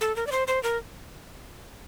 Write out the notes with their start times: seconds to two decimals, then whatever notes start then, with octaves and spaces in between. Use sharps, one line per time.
0.01 A4
0.16 A#4
0.27 D5
0.32 C5
0.47 C5
0.63 A#4